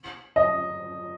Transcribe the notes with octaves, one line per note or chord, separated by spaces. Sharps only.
D#5